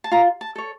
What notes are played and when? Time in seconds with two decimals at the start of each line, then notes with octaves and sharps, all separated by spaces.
0.04 A5
0.11 F4 A#5
0.41 A5
0.56 A4 C#5